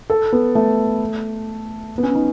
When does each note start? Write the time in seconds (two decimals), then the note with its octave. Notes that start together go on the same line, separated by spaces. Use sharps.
0.10 A4
0.33 B3
0.55 A3
1.98 B3
2.03 C#4
2.15 D#4